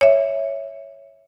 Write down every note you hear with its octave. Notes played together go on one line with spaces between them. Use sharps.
C#5 E5